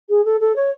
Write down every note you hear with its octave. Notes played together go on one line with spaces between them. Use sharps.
G#4
A4
A4
C#5